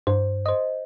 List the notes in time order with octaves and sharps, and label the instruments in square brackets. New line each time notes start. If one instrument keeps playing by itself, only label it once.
[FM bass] G2 [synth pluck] C5
[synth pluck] C5 D#5